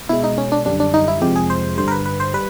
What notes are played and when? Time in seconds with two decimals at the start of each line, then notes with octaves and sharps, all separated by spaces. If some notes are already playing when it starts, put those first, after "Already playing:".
0.09 B2 G#3 E4
0.24 D#4
0.38 C#4
0.52 D4
0.66 F#2 D3 G3 D4
0.80 D4
0.94 D#4
1.08 E4
1.22 F2 C3 F3 G#3 G4
1.36 G#4
1.50 C5
1.78 G2 D3 G3 C5
1.88 A#4
1.92 B4
2.06 B4
2.20 C5
2.34 G3 B4